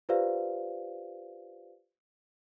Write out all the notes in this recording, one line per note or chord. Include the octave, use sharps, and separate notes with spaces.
F4 G4 B4 C5 D5 F5